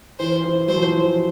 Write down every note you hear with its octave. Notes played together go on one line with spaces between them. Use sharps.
E3 C5
E3
F#3 C5
F3
E3
F3